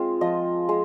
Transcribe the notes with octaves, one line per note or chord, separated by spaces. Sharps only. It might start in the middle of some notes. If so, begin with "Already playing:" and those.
Already playing: G#3 C4 F4
F3 D#5
G#3